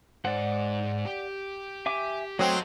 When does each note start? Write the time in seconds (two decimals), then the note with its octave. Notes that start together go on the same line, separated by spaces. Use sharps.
0.25 G#2 C5 D5 F#5
1.05 G4
1.86 E5 G#5 D6
2.39 F#3 A3 C4 A4 D#5 D#6 F#6